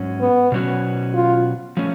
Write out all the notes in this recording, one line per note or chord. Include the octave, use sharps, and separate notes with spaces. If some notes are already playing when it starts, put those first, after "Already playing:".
Already playing: G#2 F#3 C#4 F#4
B3
B2 F#3 C#4 F#4
F4
F3 A3 C#4